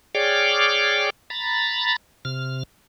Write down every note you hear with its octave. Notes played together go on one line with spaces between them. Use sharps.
G#4 C#5 D5 G5 D6 F6
A#5 B5 A6
C3 F6